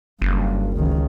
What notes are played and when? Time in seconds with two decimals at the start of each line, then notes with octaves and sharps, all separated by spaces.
0.22 F#1 G2
0.76 C#2 D#3